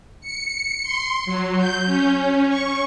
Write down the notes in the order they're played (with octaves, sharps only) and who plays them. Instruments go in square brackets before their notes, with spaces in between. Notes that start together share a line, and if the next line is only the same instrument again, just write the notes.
[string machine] C#7
C6
F#3
G6
C#4
C#6